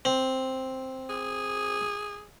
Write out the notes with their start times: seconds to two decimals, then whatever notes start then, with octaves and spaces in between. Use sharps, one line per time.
0.05 C4
1.10 G#4